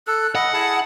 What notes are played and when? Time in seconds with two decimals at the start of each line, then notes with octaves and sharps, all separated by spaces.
0.07 A4 F#6
0.35 D#5 F#5 B5
0.54 E4 G#4 G#5 A5